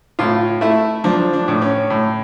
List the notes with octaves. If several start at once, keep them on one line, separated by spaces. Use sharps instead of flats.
A2 F4
A3 E4
F3 D4
D4
A2
C#4
A2